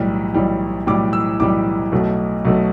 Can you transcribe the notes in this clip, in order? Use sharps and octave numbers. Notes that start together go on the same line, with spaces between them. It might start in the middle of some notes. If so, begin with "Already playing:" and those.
Already playing: B1 A2 E3 G3
B1 A2 E3 G3
B1 A2 E3 G3 D6
E6
B1 A2 E3 G3 D6
B1 B2 A3
B1 B2 A3